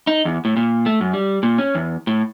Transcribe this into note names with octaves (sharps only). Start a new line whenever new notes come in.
D#4
E2
A2
A#2
A3
F#2
G3
A#2
C#4
E2
A2